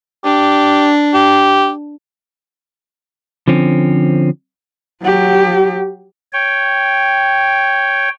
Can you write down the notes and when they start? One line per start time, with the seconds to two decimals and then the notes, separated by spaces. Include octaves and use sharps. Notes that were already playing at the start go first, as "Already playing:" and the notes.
0.24 D4 G4
1.14 G4
3.48 D3 F3 C4 C#4
5.02 F#3 G4
6.33 C#5 G5